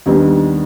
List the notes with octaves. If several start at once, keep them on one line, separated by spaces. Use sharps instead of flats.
D#2 D#3 G3 B3 D4